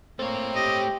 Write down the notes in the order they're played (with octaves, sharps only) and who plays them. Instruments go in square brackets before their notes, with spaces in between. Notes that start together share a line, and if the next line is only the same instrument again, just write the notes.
[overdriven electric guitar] A3 C#5 [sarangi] A#3 [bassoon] C4
[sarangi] G4 [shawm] D#5